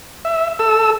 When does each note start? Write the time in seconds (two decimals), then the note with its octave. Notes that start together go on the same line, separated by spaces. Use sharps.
0.25 E5
0.59 A4 E6